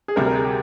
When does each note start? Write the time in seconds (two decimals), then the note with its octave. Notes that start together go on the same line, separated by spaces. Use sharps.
0.08 G#4
0.16 D2 C3 G3 A#4
0.26 A#4
0.35 G#4
0.45 G4